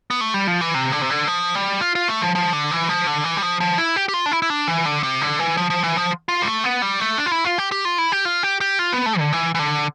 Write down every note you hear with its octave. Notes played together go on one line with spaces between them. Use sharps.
B3
A3
G3
F3
E3
C3
D3
C3
D3
F3
G3
F4
F4
A3
F3
F3
D3
E3
F3
D3
E3
G3
F3
F3
E4
G4
G4
F4
D4
E4
E4
D4
E3
D3
C3
D3
E3
F3
F3
E3
F3
F4
G3
A3
B3
G3
A3
D4
F4
E4
F4
G4
G4
F4
E4
G4
F4
G4
G4
F4
B3
A3
D3
E3
E3
D3